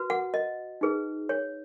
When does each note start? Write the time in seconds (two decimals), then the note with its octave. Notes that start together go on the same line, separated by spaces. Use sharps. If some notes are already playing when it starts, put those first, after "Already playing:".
Already playing: F#4 B4
0.10 F#5
0.34 D#5
0.81 D#4 G#4 B4
1.29 C#5